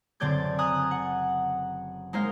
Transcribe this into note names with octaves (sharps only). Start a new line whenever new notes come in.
F#1 D3 C4 D5 G6 G#6
G#5 A#5 D#6 F#6 A#6
F#5
G#3 A#3 D#4 C5 D#5 F5